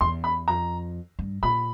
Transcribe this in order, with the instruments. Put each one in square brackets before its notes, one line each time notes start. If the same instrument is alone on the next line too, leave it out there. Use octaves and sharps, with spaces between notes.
[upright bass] E2 [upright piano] C6
[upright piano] B5
[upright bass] F2 [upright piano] A#5
[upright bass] G2
[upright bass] A#2 [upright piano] B5